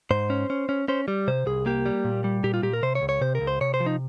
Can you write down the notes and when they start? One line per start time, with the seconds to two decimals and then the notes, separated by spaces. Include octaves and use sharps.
0.11 G#2 C5
0.30 C#4
0.50 C#4
0.69 C#4
0.88 C#4 C5
1.08 G3
1.28 C3 C5
1.46 C2 G#4
1.66 A#3 G4
1.86 G3
2.05 A#2
2.24 G3
2.44 A#2 G4
2.54 F4
2.63 A#2 G4
2.73 A#4
2.83 C3 C5
2.95 C#5
3.02 C#2
3.09 C#5
3.21 C3 C5
3.35 A#4
3.41 C#2
3.47 C5
3.61 C3 C#5
3.74 C5
3.80 F3
3.86 D#4